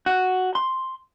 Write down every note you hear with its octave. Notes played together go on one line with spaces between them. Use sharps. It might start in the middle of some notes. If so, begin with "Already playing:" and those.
F#4
C6